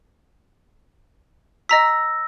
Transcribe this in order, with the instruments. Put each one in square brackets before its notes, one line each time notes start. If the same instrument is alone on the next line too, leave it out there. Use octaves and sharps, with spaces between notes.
[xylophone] D#5 A#5 B6 [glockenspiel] E6 A#6